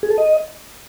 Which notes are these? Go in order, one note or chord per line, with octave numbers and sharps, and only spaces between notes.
G#4
A4
D#5